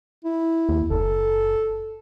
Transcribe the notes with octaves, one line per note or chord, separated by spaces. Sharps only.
E4
D#2
F#1 A4